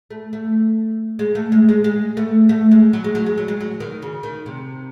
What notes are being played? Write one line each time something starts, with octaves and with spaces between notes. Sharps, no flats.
A3
A3
G#3
A3
G#3
G#3
G#3
A3
A3
G#3
F#3
G#3
F#3
G#3
F#3
G#3
F#3
D#3
C#3
D#3
C3